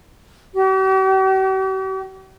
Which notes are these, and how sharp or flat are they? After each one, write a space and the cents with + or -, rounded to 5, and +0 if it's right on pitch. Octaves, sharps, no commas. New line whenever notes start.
G4 -45